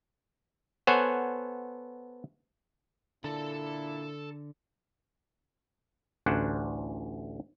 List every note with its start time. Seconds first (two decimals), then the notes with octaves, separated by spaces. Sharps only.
0.87 B3 A4 C5 C#5 F#5 G#5
3.24 A#2 D3 D4 E4 A4 A5
6.26 A1 D2 C#4 D4 C5 F#5